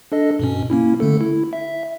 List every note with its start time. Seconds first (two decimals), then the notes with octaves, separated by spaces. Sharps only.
0.12 D4 A4 D#5
0.39 G2 B2 C#4
0.70 A#3 C#4 E4
1.00 D3 A3 A4
1.21 E4
1.53 E5